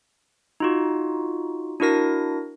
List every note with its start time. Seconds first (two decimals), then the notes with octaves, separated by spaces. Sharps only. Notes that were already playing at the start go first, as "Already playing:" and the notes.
0.60 D#4 F4 F#4
1.80 D4 E4 F#4 A#4 A#6